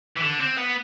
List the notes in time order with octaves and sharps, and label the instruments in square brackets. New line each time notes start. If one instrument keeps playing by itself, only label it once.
[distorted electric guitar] E3
D3
C4
B3